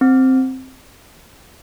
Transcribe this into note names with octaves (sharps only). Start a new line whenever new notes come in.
C4